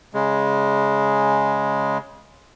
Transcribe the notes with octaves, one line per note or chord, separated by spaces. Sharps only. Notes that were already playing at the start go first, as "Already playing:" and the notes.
C#3 G#3